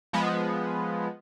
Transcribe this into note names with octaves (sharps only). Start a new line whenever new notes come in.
F3 G#3 B3